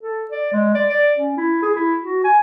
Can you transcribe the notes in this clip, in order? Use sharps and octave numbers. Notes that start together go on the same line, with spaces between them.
A4
D5
G#3
D5
D5
C#4
E4
G#4
E4
F#4
G#5